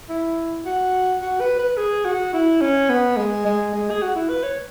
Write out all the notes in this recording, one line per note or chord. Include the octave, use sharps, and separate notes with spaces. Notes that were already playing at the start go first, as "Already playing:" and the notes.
E4
F#4
F#4
B4
B4
G#4
F#4
E4
C#4
B3
G#3
G#3
G#3
G#4
F#4
E4
B4
C#5